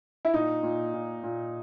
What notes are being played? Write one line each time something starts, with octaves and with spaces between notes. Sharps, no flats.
E4
A#2 D#4
A#2
A#2
A#2